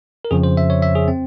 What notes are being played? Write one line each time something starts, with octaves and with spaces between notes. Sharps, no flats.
A#4
F2 C#3 F3 G#4
C5
E5
C#5
E5
G#4
C4